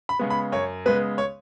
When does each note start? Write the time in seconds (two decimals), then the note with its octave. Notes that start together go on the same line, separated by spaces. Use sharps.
0.09 B5
0.19 C#3 G#3 B3
0.30 B5
0.52 F#2 C#5
0.86 C#3 G#3 B3 B4
1.18 C#5